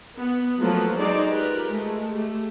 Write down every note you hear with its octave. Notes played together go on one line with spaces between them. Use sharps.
B3
F3 F#3 A3 A#3 A4 B4
F#3 G#3 D#4 G#4 C5 D5
F4 G4 A#4 B4
G#3 A3
A3 G4